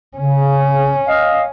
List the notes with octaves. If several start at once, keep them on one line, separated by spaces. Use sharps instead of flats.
C#3 C#4
D#5 F5